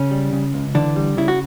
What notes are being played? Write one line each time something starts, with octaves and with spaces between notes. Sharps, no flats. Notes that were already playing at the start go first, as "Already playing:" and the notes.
Already playing: C#3 C#4
G3
C#3
C#2
D3 E3 D4
G3
C#3 E4
F#4